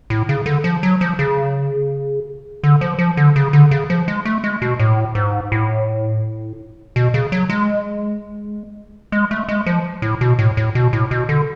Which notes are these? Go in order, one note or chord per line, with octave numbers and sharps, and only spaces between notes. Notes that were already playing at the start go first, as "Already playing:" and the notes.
A2
C#3
D3
F3
F#3
F3
C#3
D3
F3
F3
D3
C#3
D3
C#3
F3
G#3
A3
G#3
B2
A2
G#2
A2
B2
C#3
F#3
G#3
G#3
A3
G#3
F3
A2
B2
A2
A2
B2
A2
B2
D3